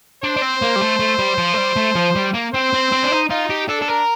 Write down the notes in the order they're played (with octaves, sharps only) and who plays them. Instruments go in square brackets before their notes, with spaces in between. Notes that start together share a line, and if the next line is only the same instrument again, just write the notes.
[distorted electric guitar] D4 [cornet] C5
[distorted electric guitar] D4
C4
A#3
G3
A3
A3
G3
F3
A3
G3
A3
F3
G3
A#3
[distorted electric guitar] C4 [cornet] C5
[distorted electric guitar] C4
C4
D4
D#4
[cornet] D#4 [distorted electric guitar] F4
[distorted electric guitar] G4
[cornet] D4 [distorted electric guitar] A4
[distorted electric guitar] A4
A#4